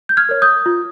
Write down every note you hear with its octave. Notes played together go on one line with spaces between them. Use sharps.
G6
F6 G#6
A#4 C#5
D#6 G6
F4